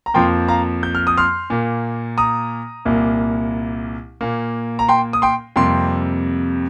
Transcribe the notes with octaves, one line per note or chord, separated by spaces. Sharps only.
A#5
F2 F3 A#3 G5 C6
F5 A#5
G6
F6
D#6
C6 F6
A#2 A#3
A#5 D#6
C2 A#2 A#3
A#2 A#3
A#5
G5 C6
D#6
G5 C6
F2 C3 G3 A#3 G5 C6